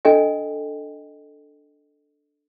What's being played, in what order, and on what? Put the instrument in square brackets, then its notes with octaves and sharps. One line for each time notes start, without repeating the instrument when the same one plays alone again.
[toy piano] D4 A4 D#5 G5 G#5